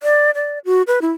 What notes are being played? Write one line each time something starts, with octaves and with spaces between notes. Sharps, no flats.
D5
D5
F#4
B4
E4